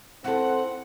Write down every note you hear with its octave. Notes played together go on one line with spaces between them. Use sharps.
C4 E4 A4 F#5